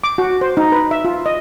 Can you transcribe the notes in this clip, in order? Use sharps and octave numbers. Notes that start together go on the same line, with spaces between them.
D6
F#4
C5
D#4
B4
E5
F4
D#5